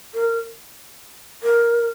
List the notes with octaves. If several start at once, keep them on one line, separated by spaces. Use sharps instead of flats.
A#4
A#4